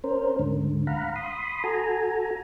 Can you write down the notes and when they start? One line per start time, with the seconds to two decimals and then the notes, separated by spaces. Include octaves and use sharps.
0.04 C#4 A#4 C5
0.39 D2 G#2 D3
0.87 F5 F#5 A#5 B5
1.16 B5 C6 D#6
1.64 F#4 A4 G#5 A#5